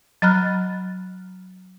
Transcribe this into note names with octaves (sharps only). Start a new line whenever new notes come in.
F#3 D#5 A#5 B5 F6 F#6